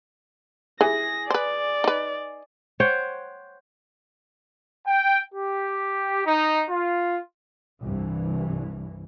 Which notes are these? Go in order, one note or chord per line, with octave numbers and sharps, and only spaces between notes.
E3 G#4 A#6
B4 C5 D5
D#4 B4
C5 C#5 F#5 G5
G5
G4
D#4
F4
C2 G2 E3